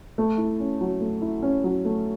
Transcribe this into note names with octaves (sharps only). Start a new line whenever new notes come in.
A3
E4
C#4
F#3
A3
E4
C#4
F#3
A3